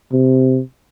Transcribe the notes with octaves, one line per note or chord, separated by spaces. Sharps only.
C3